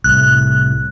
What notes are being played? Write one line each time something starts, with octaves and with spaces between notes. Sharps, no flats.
C2 A2 F#6